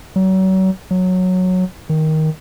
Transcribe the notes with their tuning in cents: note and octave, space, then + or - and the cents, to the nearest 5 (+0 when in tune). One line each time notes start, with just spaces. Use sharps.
F#3 +35
F#3 -10
D#3 +10